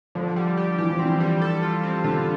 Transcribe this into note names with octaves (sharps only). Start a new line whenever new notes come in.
D3 F3
G3
G4
E3 G4
F3
E3 C4
G3
A4
F4
C4
D3 F4